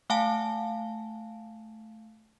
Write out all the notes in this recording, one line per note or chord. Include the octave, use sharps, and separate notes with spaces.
A3 F5 F#5 G#5 A5